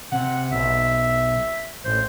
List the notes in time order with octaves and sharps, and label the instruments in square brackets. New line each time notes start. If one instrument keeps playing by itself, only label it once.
[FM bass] C3 [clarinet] F#5
[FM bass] B1 [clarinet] E5
[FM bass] A1 [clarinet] C5